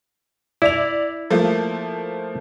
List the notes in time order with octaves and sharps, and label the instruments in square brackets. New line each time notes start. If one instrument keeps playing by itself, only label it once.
[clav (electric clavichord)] E4 [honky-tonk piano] D5 F7
[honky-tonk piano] F3 A3 A#3